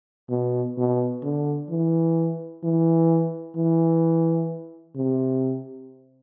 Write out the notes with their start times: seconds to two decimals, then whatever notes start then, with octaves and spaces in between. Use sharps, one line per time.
0.30 B2
0.78 B2
1.23 D3
1.70 E3
2.64 E3
3.56 E3
4.96 C3